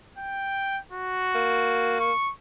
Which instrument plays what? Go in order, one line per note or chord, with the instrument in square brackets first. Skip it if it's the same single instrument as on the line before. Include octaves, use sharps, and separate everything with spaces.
[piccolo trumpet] G5
F#4
[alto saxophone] A#3
[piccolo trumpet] C#6